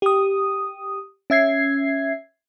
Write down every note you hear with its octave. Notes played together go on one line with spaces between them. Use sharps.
G4 D#6
C#4 E5 G#6 C7